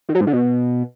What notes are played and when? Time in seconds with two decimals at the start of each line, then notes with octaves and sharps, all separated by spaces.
0.09 D#3
0.15 F#3
0.21 G#2
0.27 D3
0.33 B2